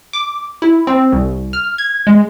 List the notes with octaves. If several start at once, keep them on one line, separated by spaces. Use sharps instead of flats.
D6
E4
C4
C2
F6
G#6
G#3